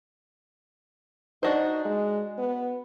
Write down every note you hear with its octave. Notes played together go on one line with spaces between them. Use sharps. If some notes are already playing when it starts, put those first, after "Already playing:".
D4 D#4 F#4 C5
G#3
B3